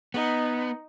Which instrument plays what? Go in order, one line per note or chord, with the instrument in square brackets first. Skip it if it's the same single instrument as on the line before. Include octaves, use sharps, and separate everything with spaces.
[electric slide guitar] B3 [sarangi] D#4